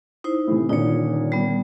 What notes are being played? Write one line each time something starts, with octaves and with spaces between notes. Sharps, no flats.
D#4 E4 C5
A2 C3 E3
D#1 A#2 D3 D#4 C#5
G3 B3